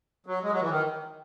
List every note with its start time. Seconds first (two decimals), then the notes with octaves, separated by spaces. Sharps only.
0.26 F#3
0.42 G#3
0.52 F#3
0.61 E3
0.69 D#3